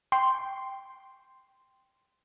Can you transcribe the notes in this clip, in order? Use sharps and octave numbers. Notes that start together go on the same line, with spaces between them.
G5 C6